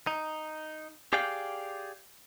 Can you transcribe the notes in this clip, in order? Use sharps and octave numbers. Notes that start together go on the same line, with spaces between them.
D#4
G4 G#4 D5 F5 G5